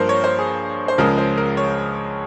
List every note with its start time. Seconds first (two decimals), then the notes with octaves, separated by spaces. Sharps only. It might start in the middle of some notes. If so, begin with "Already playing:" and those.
Already playing: G2 F3 A#3 A#4 C5
0.09 C#5
0.24 C5
0.39 G#4
0.88 C5
0.98 C#2 C#3 F3 G#3 A#4
1.18 C5
1.37 A#4
1.57 C#5